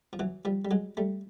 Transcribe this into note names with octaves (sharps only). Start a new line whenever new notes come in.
F3
E3 F#3
F3 G3
G3
F#3 G#3
G3 A3